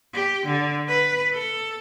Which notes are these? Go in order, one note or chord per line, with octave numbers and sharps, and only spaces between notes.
G4
D3
B4
A4